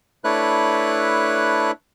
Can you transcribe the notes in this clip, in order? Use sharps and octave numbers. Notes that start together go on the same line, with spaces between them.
A3 D4 E4 B4 C#5 F#6